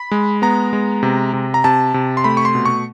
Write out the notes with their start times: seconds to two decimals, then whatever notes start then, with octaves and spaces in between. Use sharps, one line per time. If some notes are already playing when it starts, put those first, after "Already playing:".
Already playing: B5
0.11 G#3
0.42 B3 A#5
0.73 G#3
1.03 C3
1.33 C3
1.54 A#5
1.64 C3 A5
1.94 C3
2.17 C6
2.24 A3 B5
2.37 C#6
2.45 C6
2.55 B2
2.65 C#6